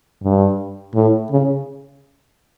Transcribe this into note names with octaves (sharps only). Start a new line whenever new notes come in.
G2
A2
C#3